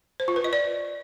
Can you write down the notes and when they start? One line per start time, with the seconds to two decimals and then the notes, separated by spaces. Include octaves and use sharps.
0.20 C5
0.28 F4
0.36 B4
0.44 D#5
0.53 D5